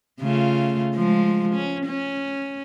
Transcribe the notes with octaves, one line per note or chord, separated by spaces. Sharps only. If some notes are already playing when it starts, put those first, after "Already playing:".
C#3 A3 F4
F3 G#3
C#4
C#4